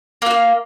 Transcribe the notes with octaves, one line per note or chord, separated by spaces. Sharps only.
A#3 F4 F#4